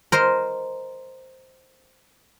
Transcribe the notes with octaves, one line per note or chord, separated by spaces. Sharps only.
A#4 C5 D#5